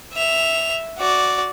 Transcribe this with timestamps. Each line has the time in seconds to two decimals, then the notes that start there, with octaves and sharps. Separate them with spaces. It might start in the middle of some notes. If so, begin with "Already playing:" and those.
0.13 E5 F7
0.98 F#4 D5